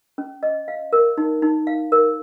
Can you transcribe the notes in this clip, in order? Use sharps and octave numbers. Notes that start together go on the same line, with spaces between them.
C#4
D#5
F5
A#4
D#4
D#4
F5
A#4